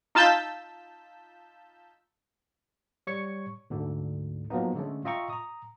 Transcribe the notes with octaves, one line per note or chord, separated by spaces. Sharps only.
D#4 F4 A5 E6 G6 B6
G3 C#5 C#6 G#6 C#7
D2 G#2 D3
F3 F#3 A#3 B3 D#4
D3 G#3 A3 C#4
F4 D#5 E5 G5 A#5 C#6
A#5 D#6